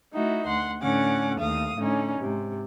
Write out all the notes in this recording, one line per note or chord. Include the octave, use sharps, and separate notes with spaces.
A3 D#4 E4 F#4
D2 F#5 C6
A2 D3 C#4 F#5 D6
D#2 A3 F5 D#6
A2 D3 C#4 D#4
G#2 C3